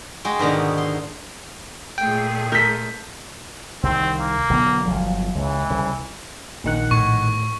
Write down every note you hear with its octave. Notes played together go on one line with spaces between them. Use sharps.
G#3 F#4 G5
G#2 B2 D3 D#3
C6
A#2 A3 G#4 G5
A4 A#4 G6 B6
C2 D#3 C4
A#3
B1 D3 B3
G1 F3 F#3
C#2 E3
C2 C#3
A#1 D#3 F#5
A2 C#6